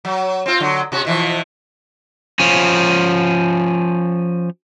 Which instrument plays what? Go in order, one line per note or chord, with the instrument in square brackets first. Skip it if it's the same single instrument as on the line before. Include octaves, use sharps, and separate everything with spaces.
[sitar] F#3
C4 F4
D3 F#3
C3 F#4
B2 E3 F3
[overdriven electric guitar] F3 C#4